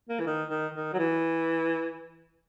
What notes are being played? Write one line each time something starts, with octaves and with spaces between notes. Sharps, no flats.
A#3
E3
D#3
D#3
D#3
F#3
E3